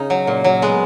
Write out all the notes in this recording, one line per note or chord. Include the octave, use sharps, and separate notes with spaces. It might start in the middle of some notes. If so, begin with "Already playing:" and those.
Already playing: C#3 D#4
F#3
A#2
F#3
G#3 B3